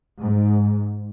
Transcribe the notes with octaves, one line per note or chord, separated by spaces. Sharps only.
G#2